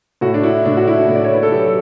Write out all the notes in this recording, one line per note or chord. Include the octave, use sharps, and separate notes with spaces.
A2 F#4
D4
E4
A2 D4
F#4
E4
A2
D5
C#5
B4
A4
F#3 G4